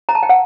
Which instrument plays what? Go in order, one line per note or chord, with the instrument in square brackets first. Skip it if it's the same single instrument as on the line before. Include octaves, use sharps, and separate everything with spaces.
[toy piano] A#5
A5
G5
F#5